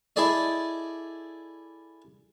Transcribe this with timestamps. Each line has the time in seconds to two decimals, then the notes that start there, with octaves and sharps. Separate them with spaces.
0.16 E4 G#4 A4 D5 D#5